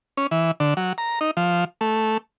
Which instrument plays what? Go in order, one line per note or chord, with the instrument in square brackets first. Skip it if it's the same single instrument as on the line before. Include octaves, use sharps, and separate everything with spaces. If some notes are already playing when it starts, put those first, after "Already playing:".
[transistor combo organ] C#4
E3
D3
F#3
A#5
D#4
F3
A3